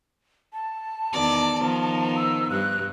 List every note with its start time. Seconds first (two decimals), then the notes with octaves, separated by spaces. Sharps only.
0.53 A5
1.13 E2 D#3 D5
1.60 D#3 F3 B3
2.16 E6
2.50 G2 F#6